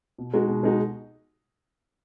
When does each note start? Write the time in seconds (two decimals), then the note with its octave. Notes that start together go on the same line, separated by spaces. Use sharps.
0.18 B2
0.34 G#3 D#4 F#4
0.48 B2
0.64 G#3 D#4 F#4